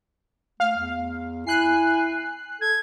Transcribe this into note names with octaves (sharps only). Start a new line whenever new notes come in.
A3 F5
E2
E4 G#5 F#6 C7
A4 G#6